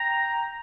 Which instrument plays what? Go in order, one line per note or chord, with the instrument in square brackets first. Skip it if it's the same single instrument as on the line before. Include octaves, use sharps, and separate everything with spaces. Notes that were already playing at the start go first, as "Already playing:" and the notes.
Already playing: [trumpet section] G5 A#5